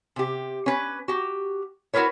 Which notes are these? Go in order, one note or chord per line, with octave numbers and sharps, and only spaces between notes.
C3 G4
C#4 B4
F#4 G4
E4 F#4 G#4 A#4 B4 C#5